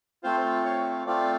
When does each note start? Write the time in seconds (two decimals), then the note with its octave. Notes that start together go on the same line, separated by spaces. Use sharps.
0.23 A3 C4 F4 C5
0.65 C#5
1.07 A3 C4 F4 D5